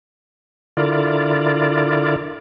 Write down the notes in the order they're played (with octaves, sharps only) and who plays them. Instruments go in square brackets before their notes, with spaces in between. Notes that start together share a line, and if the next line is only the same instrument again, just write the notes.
[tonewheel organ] D3 E4 F4 A#4 D5